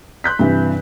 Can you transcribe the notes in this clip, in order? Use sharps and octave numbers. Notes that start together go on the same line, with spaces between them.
C6 F#6 G6 B6
G2 C3 E3